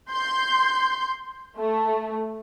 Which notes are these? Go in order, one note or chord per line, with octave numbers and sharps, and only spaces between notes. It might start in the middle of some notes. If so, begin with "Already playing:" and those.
C6 G6
A3